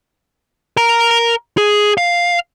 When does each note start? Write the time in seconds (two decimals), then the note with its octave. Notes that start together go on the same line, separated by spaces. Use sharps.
0.77 A#4 A#5
1.58 G#4
1.98 F5